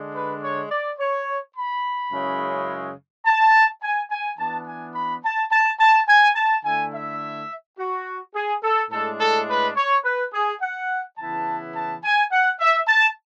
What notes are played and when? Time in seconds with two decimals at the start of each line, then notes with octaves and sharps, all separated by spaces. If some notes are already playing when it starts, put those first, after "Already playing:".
Already playing: D3 G#3 D4
0.14 B4
0.42 C#5
0.71 D5
0.99 C#5
1.56 B5
2.12 F#2 C#3 G#3 C#4 E4
3.26 A5
3.82 G#5
4.11 G#5
4.39 E3 B3 D4 A5
4.67 G#5
4.95 B5
5.24 A5
5.51 A5
5.80 A5
6.09 G#5
6.36 A5
6.64 D3 A3 E4 G#5
6.94 E5
7.79 F#4
8.35 G#4
8.63 A4
8.91 A2 G#3 D4 A4
9.20 A4
9.48 B4
9.76 C#5
10.04 B4
10.33 G#4
10.61 F#5
11.18 C#3 E3 B3 E4 A5
11.75 A5
12.03 G#5
12.32 F#5
12.60 E5
12.88 A5